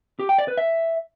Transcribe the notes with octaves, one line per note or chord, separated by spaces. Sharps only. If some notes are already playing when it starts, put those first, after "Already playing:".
G4
G5
D5
B4
E5